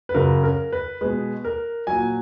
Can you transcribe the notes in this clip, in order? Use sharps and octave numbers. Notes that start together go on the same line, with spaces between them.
B4
F#2 C#3 F#3 A#4
A#4
B4
B2 G#3 B4
A#4
A#2 F#3 G#5